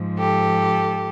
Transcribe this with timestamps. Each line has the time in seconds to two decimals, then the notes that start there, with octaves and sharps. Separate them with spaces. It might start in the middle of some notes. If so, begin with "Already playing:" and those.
Already playing: G#2 F3
0.19 G4 A4